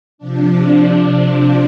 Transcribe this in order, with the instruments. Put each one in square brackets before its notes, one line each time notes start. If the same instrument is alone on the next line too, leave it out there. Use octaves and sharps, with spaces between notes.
[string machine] C3 F3 D4